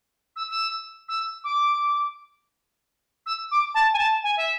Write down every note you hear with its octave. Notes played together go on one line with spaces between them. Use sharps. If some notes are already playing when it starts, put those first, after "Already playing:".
E6
E6
E6
D6
E6
D6
A5
G#5
A5
G#5
E5